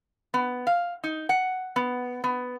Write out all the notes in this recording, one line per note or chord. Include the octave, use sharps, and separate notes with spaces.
B3
F5
D#4
F#5
B3
B3